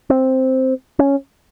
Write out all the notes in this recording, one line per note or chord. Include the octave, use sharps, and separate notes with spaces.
C4
C#4